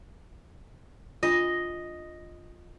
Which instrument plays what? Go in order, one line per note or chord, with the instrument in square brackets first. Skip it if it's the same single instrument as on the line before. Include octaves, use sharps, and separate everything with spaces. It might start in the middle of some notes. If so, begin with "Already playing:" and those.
[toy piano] D4 F4 [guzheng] D#5